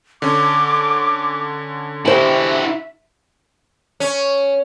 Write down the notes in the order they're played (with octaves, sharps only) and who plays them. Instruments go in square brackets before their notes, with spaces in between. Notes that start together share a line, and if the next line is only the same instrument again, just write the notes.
[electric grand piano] D3 C#4 [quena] D6
[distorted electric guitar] E4 F#4 [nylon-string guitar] G4 C5 G#5 [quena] E5
[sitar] C#4